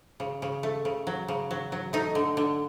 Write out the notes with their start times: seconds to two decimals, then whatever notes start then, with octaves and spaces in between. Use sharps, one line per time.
0.20 C#3
0.42 C#3
0.63 A3
0.85 C#3
1.07 F#3
1.28 C#3
1.51 F#3
1.72 F#3
1.93 A3 D#4
2.15 D3
2.37 D3